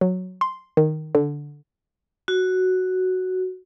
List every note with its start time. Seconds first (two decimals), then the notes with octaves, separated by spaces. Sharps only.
0.01 F#3
0.41 C6
0.77 D#3
1.15 D3
2.28 F#4